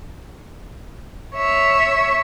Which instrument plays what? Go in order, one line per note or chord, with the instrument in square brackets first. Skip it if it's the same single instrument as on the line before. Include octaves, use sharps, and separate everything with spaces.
[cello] C#5 E5